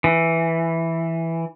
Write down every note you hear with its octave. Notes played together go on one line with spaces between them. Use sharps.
E3